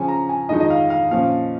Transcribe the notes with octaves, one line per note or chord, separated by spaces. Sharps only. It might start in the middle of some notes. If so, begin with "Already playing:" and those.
Already playing: C#3 F3 C#4 G#5
A#5
G#5
F2 D#3 G#3 D#4 D#5
D#5
F5
F5
A#2 F3 C#4 F5